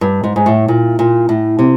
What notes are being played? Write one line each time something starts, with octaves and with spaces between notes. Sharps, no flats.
G2
G#2
G#2
A2
A#2
A#2
A2
C3